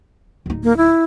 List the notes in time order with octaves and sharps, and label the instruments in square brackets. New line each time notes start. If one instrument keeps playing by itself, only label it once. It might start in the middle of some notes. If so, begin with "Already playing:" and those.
[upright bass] D1 D#4
[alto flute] A#3
E4